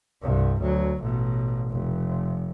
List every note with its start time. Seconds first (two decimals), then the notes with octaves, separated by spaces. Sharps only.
0.22 C2 G2
0.60 D2 F#3
1.01 A1 B2
1.70 F1